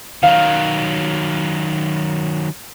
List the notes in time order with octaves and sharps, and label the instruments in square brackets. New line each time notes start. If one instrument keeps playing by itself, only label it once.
[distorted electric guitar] D#3 F#3 [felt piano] F5